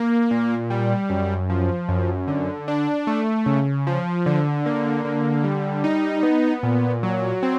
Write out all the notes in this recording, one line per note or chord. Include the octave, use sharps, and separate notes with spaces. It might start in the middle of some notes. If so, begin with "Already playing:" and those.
Already playing: A#3
A#2
G3
F#2
F3
F#2
D3
D4
A3
C#3
F3
D3
A#3
D3
G3
D#4
B3
A#2
F#3
C4